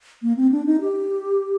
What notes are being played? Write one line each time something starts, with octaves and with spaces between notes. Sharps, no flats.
A#3
C4
D4
D#4
G4